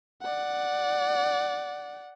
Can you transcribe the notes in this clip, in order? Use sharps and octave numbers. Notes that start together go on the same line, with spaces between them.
D5 F#5